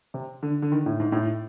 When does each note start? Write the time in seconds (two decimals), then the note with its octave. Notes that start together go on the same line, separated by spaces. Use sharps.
0.14 C3
0.43 D3
0.62 D3
0.72 D#3
0.86 A2
1.00 G#2
1.12 A2